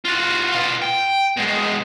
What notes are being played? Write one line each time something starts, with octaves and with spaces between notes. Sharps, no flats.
F4 F#4
B2 F4
G5
B2 G#3